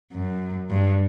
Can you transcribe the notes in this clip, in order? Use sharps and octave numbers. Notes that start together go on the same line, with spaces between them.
F#2
G2